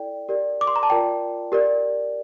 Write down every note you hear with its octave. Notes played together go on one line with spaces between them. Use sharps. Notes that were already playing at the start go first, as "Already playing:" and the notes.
Already playing: E4 A4 D5 G5
G4 A#4 D5
D6
C6
A#5
A5
F4 A#4 D5 G5
G4 A#4 D5